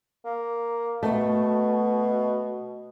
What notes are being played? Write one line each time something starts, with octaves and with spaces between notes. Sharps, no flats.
A#3
B2 A3